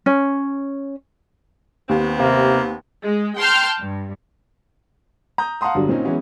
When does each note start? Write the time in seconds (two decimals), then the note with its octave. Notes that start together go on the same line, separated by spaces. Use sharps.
0.06 C#4
1.89 D#2 B3 C4
2.19 C3 A#3
3.04 G#3
3.38 G5 A5 C6 F6 G6
3.81 G2
5.38 A#5 D#6 G6
5.61 F5 F#5 A5 A#5 C6 D#6
5.75 G1 D3 F#3 G3 D4
5.88 A#2 C4 C#4 D#4
6.05 E3 F#3 G#3 B3 C#4 F#4